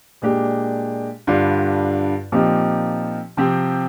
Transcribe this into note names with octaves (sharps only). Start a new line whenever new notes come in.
A#2 G#3 D4 G4
G2 D3 G3 D4 F4
A#2 F3 C4 D#4 G4
C3 F3 C4 G4